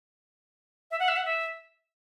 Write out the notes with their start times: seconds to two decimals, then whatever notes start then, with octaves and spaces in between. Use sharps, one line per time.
0.91 E5
1.00 F#5
1.08 E5
1.16 F#5
1.25 E5